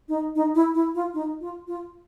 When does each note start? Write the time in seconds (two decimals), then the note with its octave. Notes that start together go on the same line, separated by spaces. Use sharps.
0.09 D#4
0.35 D#4
0.55 E4
0.74 E4
0.95 F4
1.14 D#4
1.41 F4
1.67 F4